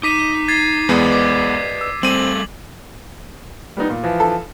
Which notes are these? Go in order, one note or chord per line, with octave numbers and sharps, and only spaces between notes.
D#4 D6 B6 D#7
G#6 A6 C7
E2 G#3 B3 B4 D5 D#5
D6
E6
G3 A3 C4 D#7 F#7
G3 B3 D#4
A#2
E3 F3
A4